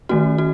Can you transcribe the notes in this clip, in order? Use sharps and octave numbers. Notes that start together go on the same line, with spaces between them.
D#3 A3 C#4 F#4
F#4